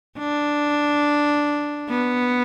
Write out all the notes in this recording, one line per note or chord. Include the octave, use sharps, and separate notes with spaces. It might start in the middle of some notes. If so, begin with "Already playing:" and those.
D4
B3